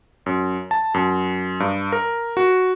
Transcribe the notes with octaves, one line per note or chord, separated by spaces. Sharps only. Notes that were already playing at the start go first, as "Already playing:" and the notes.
F#2
A5
F#2
G2
A#4
F#4